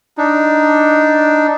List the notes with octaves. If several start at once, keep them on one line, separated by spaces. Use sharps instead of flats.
D4 D#4